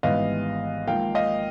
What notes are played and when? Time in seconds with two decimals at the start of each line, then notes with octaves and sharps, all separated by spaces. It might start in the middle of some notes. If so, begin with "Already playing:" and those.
0.03 G#1 G#2 E3 G3 B3 D#5 F5
0.87 G#1 G#2 F3 A#3 F5 G5
1.15 D#5 F5